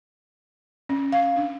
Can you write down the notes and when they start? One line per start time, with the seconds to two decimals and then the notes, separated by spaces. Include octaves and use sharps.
0.89 C#4
1.12 F5
1.36 D4